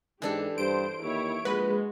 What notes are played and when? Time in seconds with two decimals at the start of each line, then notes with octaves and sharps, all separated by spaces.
0.22 G#2 E3 D4 G4 A4
0.58 G2 C5 D7
1.02 D#2 E4 C#5
1.45 A#1 G#3 F#4 B4